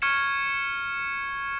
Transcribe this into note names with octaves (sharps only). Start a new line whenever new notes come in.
C#6 F6 G#6 C#7 E7